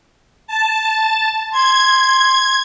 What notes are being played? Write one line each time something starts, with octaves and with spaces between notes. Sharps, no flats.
A5
C6 G#6